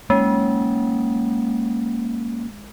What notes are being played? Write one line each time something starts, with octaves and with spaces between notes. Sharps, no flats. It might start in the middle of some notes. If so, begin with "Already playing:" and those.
G#3 A#3 C#4